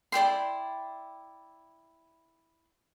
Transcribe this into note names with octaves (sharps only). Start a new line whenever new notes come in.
E4 D5 G5 C6